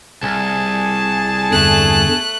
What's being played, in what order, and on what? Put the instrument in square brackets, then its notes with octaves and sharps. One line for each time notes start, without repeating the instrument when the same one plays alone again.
[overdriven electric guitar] C2 [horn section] G#4 G#5 A5
[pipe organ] E2 G2 D3 [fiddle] A3 F#6